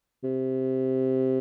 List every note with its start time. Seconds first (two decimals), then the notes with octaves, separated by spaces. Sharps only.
0.24 C3